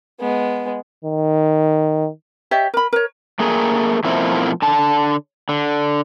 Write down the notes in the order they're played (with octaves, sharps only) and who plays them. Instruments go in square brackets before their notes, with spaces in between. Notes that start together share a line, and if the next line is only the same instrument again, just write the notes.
[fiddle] G#3 B3
[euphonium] D#3
[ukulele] G4 C#5 D#5 E5
A#4 B5
A#4 C#5
[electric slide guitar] A3 A#3 G#4
B2 F3 A3 A#3 C4 E4
D3 A5
D3